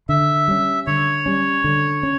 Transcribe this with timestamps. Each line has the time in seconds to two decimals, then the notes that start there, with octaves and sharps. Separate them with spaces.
0.09 D3 E5
0.48 G3 C#4
0.87 D3 C#5
1.26 G3 C#4
1.64 D3
2.03 C#4